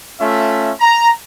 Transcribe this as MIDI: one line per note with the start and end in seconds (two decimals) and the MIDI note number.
0.20 0.71 57
0.20 0.71 61
0.20 0.71 65
0.20 0.71 76
0.81 1.10 82